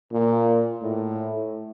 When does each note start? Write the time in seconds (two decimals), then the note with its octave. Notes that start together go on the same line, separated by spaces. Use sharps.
0.12 A#2
0.82 A2